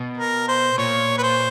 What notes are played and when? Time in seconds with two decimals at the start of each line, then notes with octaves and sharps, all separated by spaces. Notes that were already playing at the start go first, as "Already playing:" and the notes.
Already playing: B2
0.18 A#4
0.48 C5
0.78 A#2 C#5
1.18 B4
1.23 C5